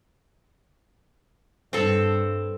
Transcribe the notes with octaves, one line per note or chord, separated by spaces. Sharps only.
G2 C4 A4